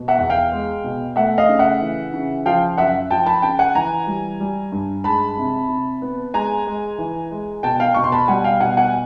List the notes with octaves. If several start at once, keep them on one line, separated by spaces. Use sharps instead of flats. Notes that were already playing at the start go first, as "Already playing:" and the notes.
Already playing: B2
E5 F#5
E2
F5 G5
G#3
B2
A3 E5 F#5
D#5 F5
C#3
E5 F#5
E3
C#3
F3 F5 G5
F#2 E5 F#5
F3 G5 A5
A5 B5
C#3 G5 A5
F#5 G#5
E3 G#5 A#5
G3
G3
G2
G#3 A5 B5
C3
C3
B3
G#3 G#5 A#5
G#3
E3
G#3
B2 G5 A5
F5 G5
B2 C#6
C6
A5 B5
G3 F#5 G#5
F5 G5
B2 F#5 G#5
F#5 G#5